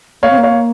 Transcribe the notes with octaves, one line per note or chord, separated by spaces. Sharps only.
A#3 C#5 F5
C4
A#3
C#5 F5